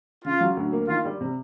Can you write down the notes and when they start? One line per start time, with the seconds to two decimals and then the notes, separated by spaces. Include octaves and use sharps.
0.25 C#3 F4
0.41 F#3
0.57 D2
0.72 A#3
0.88 D#3 F4
1.05 G3
1.21 C3